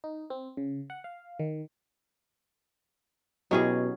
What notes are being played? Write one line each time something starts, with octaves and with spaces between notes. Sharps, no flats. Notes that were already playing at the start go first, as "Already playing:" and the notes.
D#4
C4
C#3
F#5
F5
D#3
B2 F#3 C#4 E4 G4 G#4 D#5